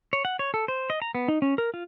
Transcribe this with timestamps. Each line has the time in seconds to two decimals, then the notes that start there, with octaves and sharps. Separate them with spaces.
0.13 C#5
0.25 F#5
0.39 C#5
0.54 A4
0.68 C5
0.90 D#5
1.02 A#5
1.15 B3
1.28 D#4
1.42 C#4
1.58 A#4
1.74 F4